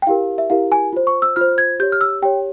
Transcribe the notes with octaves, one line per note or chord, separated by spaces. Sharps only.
G5
E4 G4 A#4 F5
E5
E4 G4 A#4 F5
G#5
F4 C5
C#6
E6
F4 C5 F6
G#6
G4 C#5 G6
F6
E6
G4 C#5 G5